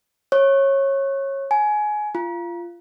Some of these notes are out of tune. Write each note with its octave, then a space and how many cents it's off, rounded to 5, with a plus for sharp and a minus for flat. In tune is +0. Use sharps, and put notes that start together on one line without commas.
C#5 -20
G#5 +20
F4 -20